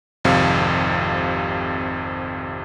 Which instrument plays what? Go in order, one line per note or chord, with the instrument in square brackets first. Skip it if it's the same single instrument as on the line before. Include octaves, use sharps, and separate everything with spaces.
[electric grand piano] G#1 F2 C3 F5